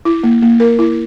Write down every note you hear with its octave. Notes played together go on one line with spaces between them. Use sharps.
E4
A#3
A#3
A#4
E4